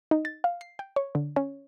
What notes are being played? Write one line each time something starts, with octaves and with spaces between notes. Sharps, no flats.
D#4
A6
F5
C7
G5
C#5
D3
C#4